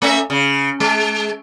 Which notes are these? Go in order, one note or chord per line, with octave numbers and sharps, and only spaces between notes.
A3 C#4 E5
C#3
G#3